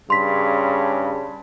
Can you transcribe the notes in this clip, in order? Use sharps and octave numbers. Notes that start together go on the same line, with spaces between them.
G2 C#3 C6 B6